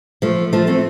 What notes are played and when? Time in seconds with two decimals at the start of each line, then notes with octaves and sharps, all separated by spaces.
0.22 F3 A3
0.53 F3 A3
0.67 A3 C4